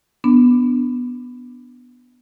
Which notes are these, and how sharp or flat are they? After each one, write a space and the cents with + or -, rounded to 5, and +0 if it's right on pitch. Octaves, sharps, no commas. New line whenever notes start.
B3 +0 D4 +0